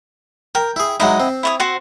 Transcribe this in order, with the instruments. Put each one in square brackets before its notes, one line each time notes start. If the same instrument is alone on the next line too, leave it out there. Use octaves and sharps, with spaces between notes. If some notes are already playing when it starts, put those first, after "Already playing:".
[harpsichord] A#4 [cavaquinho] G5
[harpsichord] E4 G#4
[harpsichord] F#3 G#3 D#4 [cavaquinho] E4 D#5 F#5
[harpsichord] C4
[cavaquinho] E4 C#5 D#6
F#4 C5 F#5